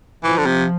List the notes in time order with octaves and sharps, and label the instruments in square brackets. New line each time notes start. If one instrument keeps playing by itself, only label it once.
[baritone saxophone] E3 [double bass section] F3
[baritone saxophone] D3
C3